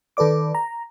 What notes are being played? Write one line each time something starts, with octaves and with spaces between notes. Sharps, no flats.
D#3 A4 B4 D5 D6
A#5